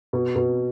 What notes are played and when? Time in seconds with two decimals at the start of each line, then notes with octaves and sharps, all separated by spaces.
0.13 B2
0.36 B2